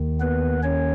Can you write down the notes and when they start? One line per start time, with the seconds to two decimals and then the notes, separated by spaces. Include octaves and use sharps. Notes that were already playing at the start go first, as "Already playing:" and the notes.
Already playing: D#2 D#3
0.20 B3 B4
0.63 C#4 C#5